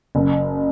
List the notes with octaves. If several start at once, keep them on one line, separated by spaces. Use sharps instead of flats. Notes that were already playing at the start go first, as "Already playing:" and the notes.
F#1